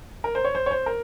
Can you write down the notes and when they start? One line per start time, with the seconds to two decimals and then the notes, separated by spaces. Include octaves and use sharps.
0.24 A#4
0.35 C5
0.45 C#5
0.55 C5
0.66 C#5
0.71 C5
0.86 A#4